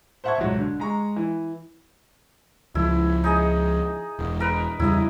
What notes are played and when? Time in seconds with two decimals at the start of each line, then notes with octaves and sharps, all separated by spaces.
0.24 C5 E5 F#5 A5 C#6 G#6
0.38 B1 G#2 F#3
0.58 D3
0.80 G#3 A#5 C#6
1.16 E3
2.75 C#2 F3 E4
3.24 D#4 G#4 D#5
4.19 E1
4.40 A#4 B4
4.79 E2 C#3 G3 E4 D#5